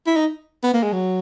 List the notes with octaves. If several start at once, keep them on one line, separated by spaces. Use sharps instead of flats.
E4
D#4
B3
A#3
G#3
F#3